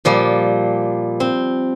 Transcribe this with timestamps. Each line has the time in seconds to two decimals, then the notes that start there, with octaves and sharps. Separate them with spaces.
0.05 A#2 F3 G3
1.20 C4